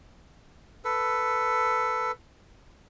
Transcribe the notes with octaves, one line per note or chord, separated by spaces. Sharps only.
A4 B4